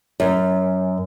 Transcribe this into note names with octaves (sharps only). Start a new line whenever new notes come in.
F#2